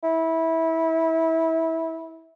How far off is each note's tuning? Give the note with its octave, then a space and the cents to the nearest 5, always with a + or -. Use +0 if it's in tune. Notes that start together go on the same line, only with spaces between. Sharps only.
E4 -20